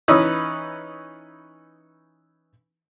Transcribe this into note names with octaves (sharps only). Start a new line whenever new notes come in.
E3 C#4 D#4 B4 D#6 E6